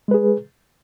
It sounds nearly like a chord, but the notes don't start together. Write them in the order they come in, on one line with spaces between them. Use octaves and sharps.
G#3 B4 G#4